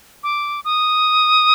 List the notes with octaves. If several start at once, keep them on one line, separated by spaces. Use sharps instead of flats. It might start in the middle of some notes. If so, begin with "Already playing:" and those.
D6
D#6